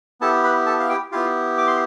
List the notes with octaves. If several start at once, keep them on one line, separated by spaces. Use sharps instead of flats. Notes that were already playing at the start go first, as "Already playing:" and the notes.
B3 E4 G4 A4 A5
B4 B5
A4 A5
F5
G4 G5
B3 E4 F4 G4 F5
D6
C6